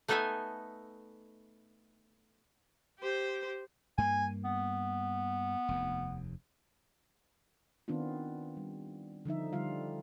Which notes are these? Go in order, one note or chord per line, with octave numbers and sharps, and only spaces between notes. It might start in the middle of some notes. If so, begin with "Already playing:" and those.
A3 B3 D#4 A4 E5 G#5
G4 C5
G2 A#3 G#5
B3
F1 D#2
D#3 B3 C4 D4 F4
G3
D3 F3 D#4 E5
D3 G3 F4 F5